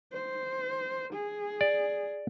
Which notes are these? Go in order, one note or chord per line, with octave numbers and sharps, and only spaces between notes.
C5
G#4
D5